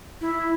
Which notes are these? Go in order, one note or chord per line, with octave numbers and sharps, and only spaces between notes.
E4